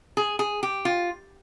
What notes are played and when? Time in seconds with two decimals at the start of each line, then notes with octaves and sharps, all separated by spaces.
0.17 G#4
0.39 G#4
0.63 G4
0.85 F4